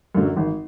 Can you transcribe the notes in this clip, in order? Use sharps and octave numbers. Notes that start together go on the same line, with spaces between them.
F#2 D3 F#3
G#1